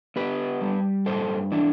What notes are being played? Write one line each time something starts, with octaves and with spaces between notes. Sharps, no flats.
B3 G4 B4
G3
G2 A4 C5
E3 D4